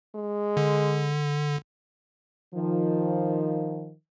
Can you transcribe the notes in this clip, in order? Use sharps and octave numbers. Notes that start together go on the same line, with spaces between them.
G#3
D3
D#3 F3